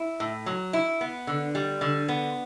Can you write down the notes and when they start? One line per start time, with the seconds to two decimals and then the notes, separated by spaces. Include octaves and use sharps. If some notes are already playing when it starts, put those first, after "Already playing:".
Already playing: E4
0.20 A2
0.46 F#3
0.73 E4
1.01 B3
1.27 D3
1.55 G3
1.81 D3
2.08 B3